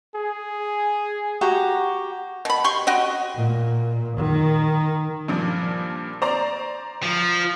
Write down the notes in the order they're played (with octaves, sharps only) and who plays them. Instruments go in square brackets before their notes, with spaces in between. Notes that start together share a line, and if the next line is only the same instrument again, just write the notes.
[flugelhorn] G#4
[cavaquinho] F#4 G4 A#5
[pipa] B2 B5
G4 C6 C#6
F#4 G4 D#5
[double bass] A#2
D#3
[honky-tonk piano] G2 A#2 F3
C5 D5 A#5
[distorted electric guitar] F3